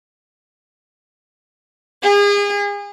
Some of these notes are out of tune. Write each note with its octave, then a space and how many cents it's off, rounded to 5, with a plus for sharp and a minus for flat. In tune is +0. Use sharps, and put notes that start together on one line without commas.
G#4 -35